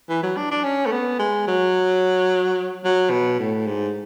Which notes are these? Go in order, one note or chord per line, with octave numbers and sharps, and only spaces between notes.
E3
F#3
D4
D4
C#4
A3
B3
G#3
F#3
F#3
B2
A2
G#2